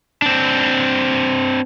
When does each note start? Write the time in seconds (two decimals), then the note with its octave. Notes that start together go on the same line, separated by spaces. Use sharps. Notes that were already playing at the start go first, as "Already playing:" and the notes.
0.22 C4 D4